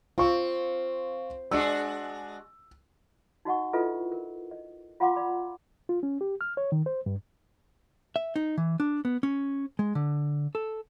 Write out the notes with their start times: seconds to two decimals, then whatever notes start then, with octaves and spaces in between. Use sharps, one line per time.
0.18 C4 F4 C#6
1.51 G#3 D4 F#4 E6
3.45 D#4 F#4 D#5 F#5 C#6
3.73 E4 F4 A4 B4 D#5 E5
4.12 A#4
4.51 D#5
5.00 F4 F5 F#5 A#5 C6 D6
5.16 D5 B5 D6
5.89 F4
6.03 C#4
6.21 G4
6.41 F6
6.57 C#5
6.72 D#3
6.86 C5
7.06 G2
8.16 E5
8.36 D#4
8.58 E3
8.80 D4
9.05 B3
9.23 C#4
9.79 G#3
9.95 D3
10.55 A4